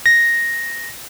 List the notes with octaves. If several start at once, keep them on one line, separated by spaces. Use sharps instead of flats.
A#6